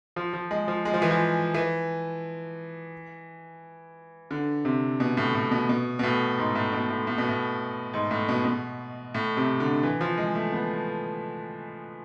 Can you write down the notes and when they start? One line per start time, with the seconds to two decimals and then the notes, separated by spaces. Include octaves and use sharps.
0.16 F3
0.33 F3
0.51 G#3
0.68 F3
0.85 G#3
0.94 F3
1.02 E3
1.11 F3
1.54 E3
4.31 D3
4.65 C3
5.00 B2
5.17 A2
5.35 A2
5.51 B2
5.69 B2
5.99 B2
6.03 A2
6.38 G#2
6.55 A2
6.73 B2
6.90 A2
7.07 A2
7.18 B2
7.29 A2
7.94 G#2
8.11 A2
8.28 B2
8.45 B2
9.15 A2
9.37 C3
9.60 D3
9.83 E3
10.01 F3
10.18 G#3
10.35 A3
10.52 B3